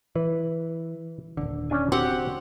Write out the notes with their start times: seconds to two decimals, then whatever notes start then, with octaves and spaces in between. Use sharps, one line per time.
0.15 E3 B4
1.37 D#1 B1 D3
1.70 C#4 D4 G#5
1.92 C4 F#4 G4 F#5